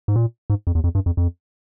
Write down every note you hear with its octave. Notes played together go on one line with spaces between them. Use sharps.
G#2
A#2
G#2
F2
E2
F2
G2
F2
F2